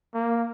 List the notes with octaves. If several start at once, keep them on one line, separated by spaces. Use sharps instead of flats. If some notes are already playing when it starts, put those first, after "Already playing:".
A#3